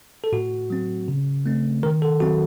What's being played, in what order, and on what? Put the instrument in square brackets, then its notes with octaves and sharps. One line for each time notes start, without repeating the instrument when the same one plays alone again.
[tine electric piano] A4
A2 F#4
F#3 C4
C#3
A3 C4
D#3 A#4
A4
F#3 C4 F#4